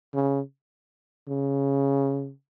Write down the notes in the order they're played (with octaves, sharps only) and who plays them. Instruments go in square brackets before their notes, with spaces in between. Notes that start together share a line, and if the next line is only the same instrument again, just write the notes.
[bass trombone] C#3
C#3